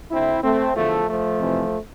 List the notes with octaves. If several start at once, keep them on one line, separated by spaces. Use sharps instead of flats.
D2 D3 C4 E4
A3 C4
E2 D3 F3 A3
F3 A3
F2 C3 E3